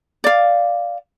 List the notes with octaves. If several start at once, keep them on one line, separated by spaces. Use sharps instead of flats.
D5 F5